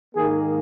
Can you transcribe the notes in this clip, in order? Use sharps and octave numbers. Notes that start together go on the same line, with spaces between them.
G#2 D#3 A#3 G#4